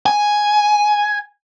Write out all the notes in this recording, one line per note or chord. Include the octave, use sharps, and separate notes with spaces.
G#5